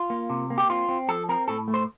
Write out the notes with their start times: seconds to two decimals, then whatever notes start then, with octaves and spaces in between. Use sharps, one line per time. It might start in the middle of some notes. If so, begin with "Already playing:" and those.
Already playing: F4
0.10 A#3
0.30 C3
0.50 A#3
0.58 G4
0.70 C4 F4
0.89 C4
1.09 F3 A4
1.29 C4 A#4
1.48 A2 A4
1.68 A3
1.74 C5